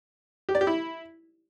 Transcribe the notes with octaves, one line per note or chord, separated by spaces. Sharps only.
G4
D5
G4
E4